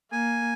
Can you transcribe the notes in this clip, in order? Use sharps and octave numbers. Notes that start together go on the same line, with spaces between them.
A#3 G#5